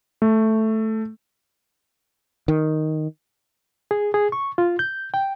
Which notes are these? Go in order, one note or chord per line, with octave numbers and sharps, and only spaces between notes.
A3
D#3
G#4
G#4
C#6
F4
G6
G5